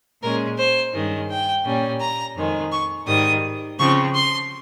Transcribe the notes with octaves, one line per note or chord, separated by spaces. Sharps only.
A#2 G#3 C#4 A#4
C5
G2 D#3 G#3 C#4
G5
A#2 G3 C#4
A#5
F2 D#3 G#3
C#6
G#2 D#3 G3 D#6
C#3 F3 C4 C#6
C6